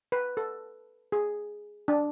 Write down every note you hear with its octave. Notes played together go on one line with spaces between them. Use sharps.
B4
A4
G#4
D4